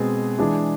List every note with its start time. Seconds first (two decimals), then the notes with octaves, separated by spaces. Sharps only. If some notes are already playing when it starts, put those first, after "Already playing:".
Already playing: B2 G#3 C4 G#4
0.38 E3 G#3 D4 G#4